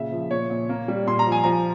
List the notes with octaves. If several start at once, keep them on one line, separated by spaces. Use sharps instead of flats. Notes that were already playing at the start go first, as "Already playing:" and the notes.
Already playing: A#2 C#3 E5
F3
A#2 C#5
A#2
A#3
G3
A#2 C6
A#5
F3
G#5
F3 A#5